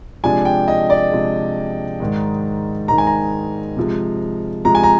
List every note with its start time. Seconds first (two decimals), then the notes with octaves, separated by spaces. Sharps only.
0.24 C3 F3 G#3 D4 G#5
0.45 G5
0.68 D#5
0.90 D5
1.12 C3 F3 G#3 D4
2.00 G#2 D#3 G#3 D#4
2.88 G#2 D#3 G#3 D#4 A#5
2.98 G#5
3.07 A#5
3.76 C3 F3 G#3
4.65 C3 F3 G#3 A#5
4.75 G#5
4.84 A#5